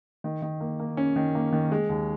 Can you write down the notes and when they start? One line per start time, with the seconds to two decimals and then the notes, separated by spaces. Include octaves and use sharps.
0.24 D#3
0.42 D#3
0.61 A#3
0.80 A#3
0.97 C#4
1.16 D#3
1.35 A#3
1.53 D#3
1.72 G#3
1.89 D#2